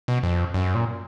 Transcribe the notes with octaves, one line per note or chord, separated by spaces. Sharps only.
B2
F2
F#2
A#2